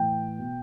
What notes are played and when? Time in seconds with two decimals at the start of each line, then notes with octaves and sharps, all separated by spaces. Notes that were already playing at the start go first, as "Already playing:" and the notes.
Already playing: A2 E3 G5
0.38 B2